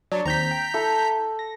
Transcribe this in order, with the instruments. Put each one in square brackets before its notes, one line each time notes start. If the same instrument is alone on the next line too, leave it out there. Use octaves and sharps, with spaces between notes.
[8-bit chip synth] F#3 [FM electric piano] D4 A5 C#6
[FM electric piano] D#2 C4 [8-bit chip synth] A#5 G6 B6
[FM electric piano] G5
[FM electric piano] E4 [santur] A4
[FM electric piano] A#6